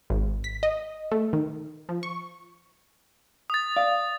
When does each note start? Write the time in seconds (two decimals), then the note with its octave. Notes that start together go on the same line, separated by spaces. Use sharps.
0.10 G#1
0.44 B6
0.63 D#5
1.11 A3
1.33 D#3
1.89 F3
2.03 C#6
3.50 D#6 A6
3.76 D5 F5